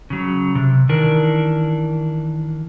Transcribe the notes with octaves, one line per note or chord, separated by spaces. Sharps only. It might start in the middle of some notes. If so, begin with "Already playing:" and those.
C#3 F#3
C3
D#3 E3 D4 A#4